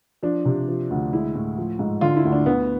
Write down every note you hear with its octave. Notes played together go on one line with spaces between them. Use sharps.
F3 D4
C3
F3
D2
G#3 E4
A2
F3
G#2
D3 F4
E4
D2
D4
D2 B3